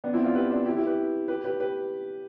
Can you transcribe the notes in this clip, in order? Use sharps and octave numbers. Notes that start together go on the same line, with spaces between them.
B3 D4
C4 E4
D4 F4
G4 B4
D4 F4
E4 G4
E4 G4
G4 B4
G4 B4
G4 B4
G4 B4